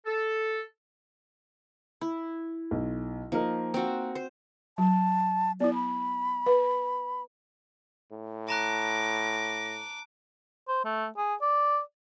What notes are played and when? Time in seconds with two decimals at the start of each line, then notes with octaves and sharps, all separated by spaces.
0.06 A4
2.01 E4
2.71 B1
3.32 F3 A#3 D#4 A#4
3.74 C4 F#4
4.15 C5
4.78 F#3 A5
5.60 B3 E4 D5
5.74 B5
6.46 B4
8.12 A2
8.49 A5 A#5 D6 F#6 A#6
10.68 C5
10.85 A3
11.17 G#4
11.41 D5